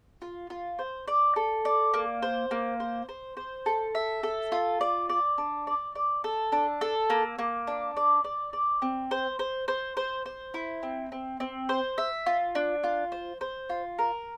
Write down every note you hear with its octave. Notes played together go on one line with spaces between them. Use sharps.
F4
F4
C5
D5
A4
D5
A#3
C5
A#3
C5
C5
C5
A4
E5
A4
F4
D5
D5
D4
D5
D5
A4
D4
A4
A#3
A#3
D4
D5
D5
D5
C4
C5
C5
C5
C5
C5
E4
C4
C4
C4
C5
E5
F4
D4
F4
C5
C5
F4
A#4